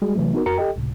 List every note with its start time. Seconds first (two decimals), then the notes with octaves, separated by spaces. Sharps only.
0.02 G3 G#3 F#4 G#4
0.16 C3 E3 F#3 A3
0.33 B3 D#4 F#4 A#4
0.46 F2 F#4 A#4 A#5 C#7
0.58 G4 A4 D#5 G5
0.76 C#2 A2 C3